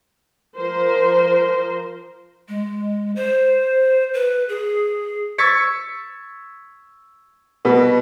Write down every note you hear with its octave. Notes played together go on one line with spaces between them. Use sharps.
F3 A#4 C5
G#3
C5
B4
G#4
C#6 E6 G#6 A6 B6 C#7
B2 G3 B3